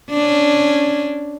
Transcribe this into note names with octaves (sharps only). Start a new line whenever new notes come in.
C#4 D4